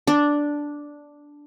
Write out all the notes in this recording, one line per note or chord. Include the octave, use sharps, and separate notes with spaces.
D4